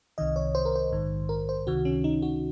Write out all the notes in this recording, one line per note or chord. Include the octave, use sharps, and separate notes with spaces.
C2 C3 D#3 D#5
C#5
C5
A#4
C5
A#1 G#2 D#3
A#4
C5
C#2 C3 D#3 F#4
C#4
D#4
F#4